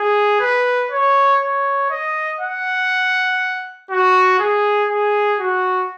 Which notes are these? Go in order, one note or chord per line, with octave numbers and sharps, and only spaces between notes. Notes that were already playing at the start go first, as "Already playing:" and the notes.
Already playing: G#4
B4
C#5
C#5
D#5
F#5
F#4
G#4
G#4
F#4